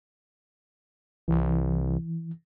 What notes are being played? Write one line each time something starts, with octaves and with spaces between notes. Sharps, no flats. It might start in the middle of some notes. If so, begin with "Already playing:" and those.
C2 E3